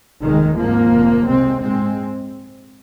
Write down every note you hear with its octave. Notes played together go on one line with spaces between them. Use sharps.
F1 D#2 D#3 G#3
G#1 G#2 F3 A#3
F1 D#2
C2 C3 G#3 C4
A#1 G#2 G#3 C4